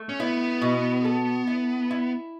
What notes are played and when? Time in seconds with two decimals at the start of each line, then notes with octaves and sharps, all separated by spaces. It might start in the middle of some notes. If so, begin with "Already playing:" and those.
Already playing: A3
0.09 C#4
0.20 B3 E4
0.61 B2
1.05 A4
1.47 E4
1.91 E4